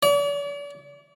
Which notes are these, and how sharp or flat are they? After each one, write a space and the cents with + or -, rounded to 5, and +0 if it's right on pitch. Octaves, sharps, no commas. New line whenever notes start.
D5 -45